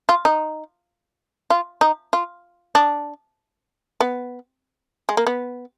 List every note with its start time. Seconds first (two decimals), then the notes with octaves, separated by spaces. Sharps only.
0.09 F4
0.25 D#4
1.50 F4
1.81 D#4
2.13 F4
2.75 D4
4.00 B3
5.09 G#3
5.17 A#3
5.27 B3